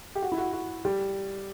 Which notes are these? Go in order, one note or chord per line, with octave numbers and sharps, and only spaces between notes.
G4
F#4
E4
F#4
F#4
G3